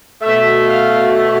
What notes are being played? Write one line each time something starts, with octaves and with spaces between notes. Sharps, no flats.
B2 A3 E5
F5